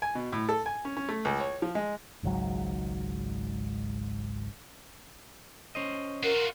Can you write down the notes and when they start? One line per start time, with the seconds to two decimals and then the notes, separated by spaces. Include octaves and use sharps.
0.02 G#5
0.15 B2
0.32 A2
0.49 A4
0.66 G#5
0.85 C#4
0.97 C#4
1.09 A3
1.25 C#2
1.40 C#5
1.62 F3
1.75 G#3
2.23 G#1 C#2 G#2 F#3
5.75 C#4 C5 D#5
6.23 F4 F#4 A#4